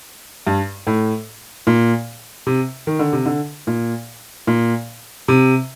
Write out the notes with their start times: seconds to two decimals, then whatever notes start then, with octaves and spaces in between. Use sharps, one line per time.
0.47 G2
0.87 A2
1.67 A#2
2.47 C3
2.87 D#3
2.99 D3
3.13 C3
3.26 D3
3.67 A#2
4.47 A#2
5.28 C3